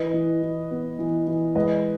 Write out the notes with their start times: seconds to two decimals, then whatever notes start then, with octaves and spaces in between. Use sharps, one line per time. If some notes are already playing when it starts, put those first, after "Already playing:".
Already playing: E3 B4 D#5
0.14 E3
0.42 E3
0.71 B3
0.99 E3
1.27 E3
1.55 G#3 B4 D#5